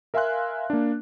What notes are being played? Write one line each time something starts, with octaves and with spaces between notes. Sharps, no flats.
A#4 E5 F5 G#5 C6 F#6
A#3 D4